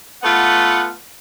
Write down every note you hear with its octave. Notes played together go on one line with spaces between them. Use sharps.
A3 B3 F4 B4 F#5